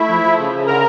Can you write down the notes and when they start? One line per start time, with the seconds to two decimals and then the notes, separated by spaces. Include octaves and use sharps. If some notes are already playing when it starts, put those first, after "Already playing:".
Already playing: A3 E4 E5
0.09 F3
0.23 F3
0.38 C#3
0.52 C#3
0.67 D3 A#4 A#5